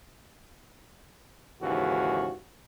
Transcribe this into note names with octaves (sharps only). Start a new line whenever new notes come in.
D#2 G#2 C#3 E3 F#4